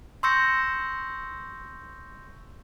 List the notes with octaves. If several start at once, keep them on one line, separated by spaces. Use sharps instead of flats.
C6 C#6 E6 G6 A#6 C#7